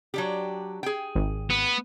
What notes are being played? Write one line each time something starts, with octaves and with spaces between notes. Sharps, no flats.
F#3 D4 G4
G#4 G5
G#1
B3